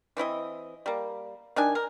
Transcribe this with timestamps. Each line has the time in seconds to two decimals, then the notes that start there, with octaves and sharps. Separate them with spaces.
0.17 E3 C4 E4 D#5
0.86 G3 A#3
1.56 D#3 D4 G#5
1.75 A#4